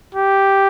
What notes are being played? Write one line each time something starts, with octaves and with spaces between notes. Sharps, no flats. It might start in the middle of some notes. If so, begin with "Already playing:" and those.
G4